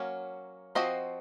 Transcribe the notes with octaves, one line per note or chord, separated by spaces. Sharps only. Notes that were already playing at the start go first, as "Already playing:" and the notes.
Already playing: F#3 A#3 C#4
F3 C4 F#4 C5 D#5